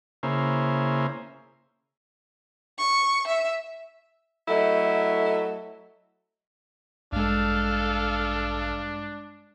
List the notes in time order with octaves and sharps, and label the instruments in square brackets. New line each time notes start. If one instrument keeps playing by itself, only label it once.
[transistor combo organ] C#3 A#3 E4 G#4 C5
[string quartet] C#6
E5
[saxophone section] F#3 A3 E4 A4 D#5
[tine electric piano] A1 [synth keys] G2 G#3 [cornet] D4 [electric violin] A4 F5